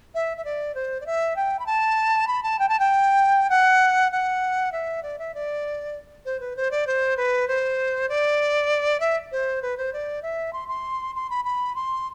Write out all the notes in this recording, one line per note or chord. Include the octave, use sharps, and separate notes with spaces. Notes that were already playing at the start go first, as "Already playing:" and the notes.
E5
E5
D5
C5
D5
E5
G5
B5
A5
B5
A5
G5
A5
G5
F#5
F#5
E5
D5
E5
D5
C5
B4
C5
D5
C5
B4
C5
D5
E5
C5
B4
C5
D5
E5
C6
C6
C6
B5
B5
C6